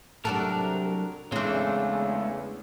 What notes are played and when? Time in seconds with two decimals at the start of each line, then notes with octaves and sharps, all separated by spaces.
0.25 C2 F#3 D4 F#4 A4 A#4
1.32 E2 C#3 G#3 A3 C4 D4